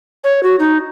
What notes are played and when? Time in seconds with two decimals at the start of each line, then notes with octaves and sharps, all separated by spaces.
0.24 C#5
0.43 F#4
0.59 D#4